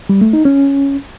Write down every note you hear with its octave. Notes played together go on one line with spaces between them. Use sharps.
G3
A3
D#4
C#4